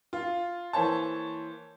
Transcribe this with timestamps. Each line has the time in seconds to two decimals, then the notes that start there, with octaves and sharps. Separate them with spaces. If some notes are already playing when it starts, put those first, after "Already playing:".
0.13 F4
0.73 E3 A#3 C5 C#5 A5